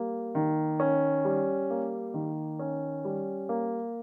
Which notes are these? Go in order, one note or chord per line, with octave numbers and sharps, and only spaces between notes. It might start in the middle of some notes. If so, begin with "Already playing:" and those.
Already playing: G3 A#3
D#3
C#4
G3
A#3
D#3
C#4
G3
A#3